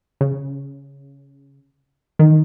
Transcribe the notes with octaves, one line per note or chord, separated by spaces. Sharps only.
C#3
D#3